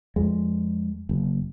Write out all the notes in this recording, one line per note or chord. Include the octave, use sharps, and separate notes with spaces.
F2 G#3
F#1